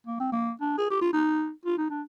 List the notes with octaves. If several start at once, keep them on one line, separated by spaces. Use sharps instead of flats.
A#3
C4
A#3
D4
G#4
G4
F4
D#4
F4
D#4
D4